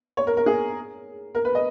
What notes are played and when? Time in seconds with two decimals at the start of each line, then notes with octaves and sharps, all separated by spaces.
0.17 C#5
0.27 A#4
0.37 A#4
0.46 G#4
1.35 A#4
1.45 B4
1.55 D#5